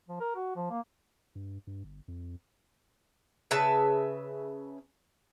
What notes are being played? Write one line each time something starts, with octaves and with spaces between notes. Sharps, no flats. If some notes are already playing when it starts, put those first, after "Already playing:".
F3
A#4
F#4
F3
A#3
G2
G2
G1
F2
C#3 B4 E5 A5